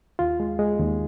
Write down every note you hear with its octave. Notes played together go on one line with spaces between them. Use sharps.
D#2 F4
G#3
G#3
D#2